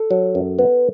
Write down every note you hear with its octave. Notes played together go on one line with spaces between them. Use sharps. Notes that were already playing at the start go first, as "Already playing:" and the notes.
Already playing: A4
F#3
F#2
B3